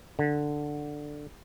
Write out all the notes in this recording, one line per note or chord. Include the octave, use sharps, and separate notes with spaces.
D3